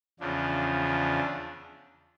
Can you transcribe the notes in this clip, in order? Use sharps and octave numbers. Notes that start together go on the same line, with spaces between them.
E2 C#3 F3 D4
D4